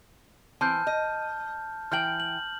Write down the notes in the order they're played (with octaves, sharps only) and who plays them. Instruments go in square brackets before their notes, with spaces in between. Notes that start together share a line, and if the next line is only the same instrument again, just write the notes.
[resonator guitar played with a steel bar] E3 C4 [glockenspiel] A5 F6 G6
[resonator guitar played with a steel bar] D#5
[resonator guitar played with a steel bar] E3 G5 [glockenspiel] F6 G6 F#7
[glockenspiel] F#7